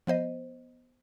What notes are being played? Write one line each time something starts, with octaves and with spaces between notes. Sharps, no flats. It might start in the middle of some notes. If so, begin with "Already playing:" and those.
F3 B3 C5 D#5